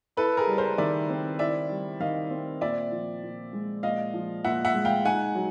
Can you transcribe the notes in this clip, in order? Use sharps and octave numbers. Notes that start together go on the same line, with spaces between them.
E4 A4 B4
G#4 A#4
G3
A#4 C5
D#3 D5 E5
C4
E4 D5 E5
G3
D#3 D#5 F5
C4
A#2 D5 E5
F3
A#2
G#3
A#2 D#5 F5
F3
A#2 E5 F#5
E5 F#5
G#3
F5 G5
D#4 F#5 G#5
F#3